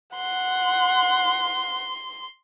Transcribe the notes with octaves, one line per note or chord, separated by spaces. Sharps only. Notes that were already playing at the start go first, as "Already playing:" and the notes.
F#5 C6